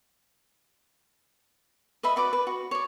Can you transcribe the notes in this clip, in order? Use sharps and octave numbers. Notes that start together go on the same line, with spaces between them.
B4 D#5 E5 B5
F#4 B4 D5 D6
B4
F#4
C#5 D5